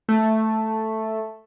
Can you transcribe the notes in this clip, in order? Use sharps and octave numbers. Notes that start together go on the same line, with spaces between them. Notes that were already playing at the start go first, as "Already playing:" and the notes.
A3